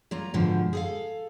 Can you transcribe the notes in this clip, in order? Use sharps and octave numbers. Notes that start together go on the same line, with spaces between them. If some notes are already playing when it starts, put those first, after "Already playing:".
F#3 A#3 F4 A#5
G#2 B2 D3 F3
G#4 A4 F5